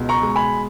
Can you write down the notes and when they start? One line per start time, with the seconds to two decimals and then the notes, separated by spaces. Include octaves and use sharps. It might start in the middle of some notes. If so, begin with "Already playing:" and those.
Already playing: C#2 B2
0.09 A#5 C#6
0.22 G#3
0.36 G#5 B5